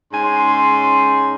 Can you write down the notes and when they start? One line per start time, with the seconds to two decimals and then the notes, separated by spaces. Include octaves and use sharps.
0.13 G#2 C#4 G#5 C6